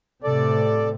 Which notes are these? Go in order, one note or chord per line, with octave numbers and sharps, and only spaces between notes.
A2 C3 A4 D5